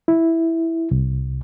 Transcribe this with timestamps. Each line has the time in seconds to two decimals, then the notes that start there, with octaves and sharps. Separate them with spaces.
0.08 E4
0.91 C2